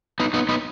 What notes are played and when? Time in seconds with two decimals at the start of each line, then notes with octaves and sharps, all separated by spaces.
0.20 B3 D#4
0.34 B3 D#4
0.49 B3 D#4